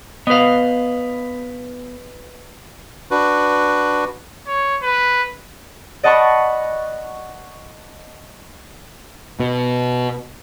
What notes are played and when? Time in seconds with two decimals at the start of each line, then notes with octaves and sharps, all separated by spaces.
0.27 B3 B4 D#5 F5
3.11 D4 F#4 B4
4.47 C#5
4.82 B4
6.03 D5 D#5 F#5 A5 B5 C#6
9.40 B2